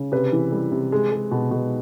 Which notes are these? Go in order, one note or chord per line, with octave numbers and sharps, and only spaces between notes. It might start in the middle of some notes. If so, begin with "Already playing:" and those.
Already playing: C#3
C3 B4
E3
G3
C3
G#3
G#3
B2
B2